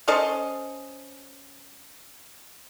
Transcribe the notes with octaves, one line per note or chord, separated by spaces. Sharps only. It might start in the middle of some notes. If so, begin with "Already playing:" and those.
C#4 A4 C5 D#5